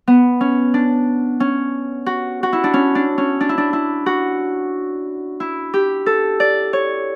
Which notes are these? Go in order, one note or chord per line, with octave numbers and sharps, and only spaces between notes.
B3
C#4
D4
C#4
F#4
F#4
E4
D4
C#4
D4
C#4
D4
E4
D4
E4
F#4
E4
G4
A4
D5
C#5